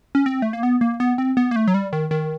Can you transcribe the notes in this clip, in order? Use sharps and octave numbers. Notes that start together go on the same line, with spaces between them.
C#4
C4
A3
A#3
B3
A#3
B3
C4
B3
A#3
A3
F#3
G3
D#3
D#3